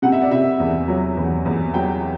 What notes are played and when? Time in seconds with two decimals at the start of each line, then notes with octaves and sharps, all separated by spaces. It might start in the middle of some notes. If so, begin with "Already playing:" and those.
0.02 C3 F#5
0.12 E5
0.22 D5
0.31 C3 E5
0.60 E2
0.88 F#3
1.17 E2
1.45 E2
1.74 F#3 G5